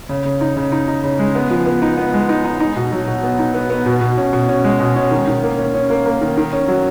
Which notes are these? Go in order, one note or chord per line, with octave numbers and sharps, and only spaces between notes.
C#3
C#3
D#4
C#3
D#4
D#4
C#3
G#3
B3
F3
B3
D#4
B3
G#3
D#4
D#4
D#4
B2
F#3
B2
B3
D#4
B3
B3
B2
B2
C#4
B2
C#4
G#3
B2
C#4
D#3
D#3
A#3
C#4
C#4
A#3
A#3
D#3
D#3
C#4
F#3